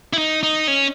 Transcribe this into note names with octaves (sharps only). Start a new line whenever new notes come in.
E4
D#4
D#4
C#4